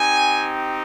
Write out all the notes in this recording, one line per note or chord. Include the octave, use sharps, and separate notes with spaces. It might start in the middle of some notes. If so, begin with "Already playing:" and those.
Already playing: C4 D#4 G4 G#5